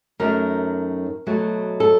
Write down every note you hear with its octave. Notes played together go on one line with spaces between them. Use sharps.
F#2 D#3 F#3 A3 A#4
B2 F#3 A3
A4